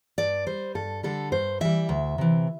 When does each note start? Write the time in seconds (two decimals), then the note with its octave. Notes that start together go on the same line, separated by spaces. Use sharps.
0.18 G2 D5
0.46 G3 C5
0.75 G2 A4
1.03 D3 G3 A4
1.32 G2 C5
1.61 E3 G3 E5
1.89 D2
2.18 C3 E3